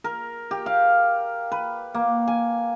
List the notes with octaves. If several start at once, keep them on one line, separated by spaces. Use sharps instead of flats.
A#4
G4
F5
B4
A#3
G#5